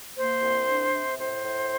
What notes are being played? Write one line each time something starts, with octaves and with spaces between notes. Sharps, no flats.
A#3 C5
C2
D4
C3
A2 C5
A2